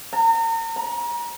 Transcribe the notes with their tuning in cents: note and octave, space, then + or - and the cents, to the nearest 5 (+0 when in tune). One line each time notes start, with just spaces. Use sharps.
A#5 -40
A#5 +30